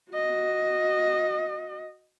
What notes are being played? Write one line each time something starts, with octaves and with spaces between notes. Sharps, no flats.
F#4 D#5